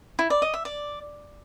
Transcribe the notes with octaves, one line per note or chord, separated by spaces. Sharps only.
E4
D5
D#5
E5
D5